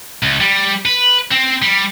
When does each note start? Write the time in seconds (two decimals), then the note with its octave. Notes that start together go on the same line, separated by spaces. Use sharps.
0.23 C#2
0.40 G3
0.85 B4
1.31 C4
1.62 G3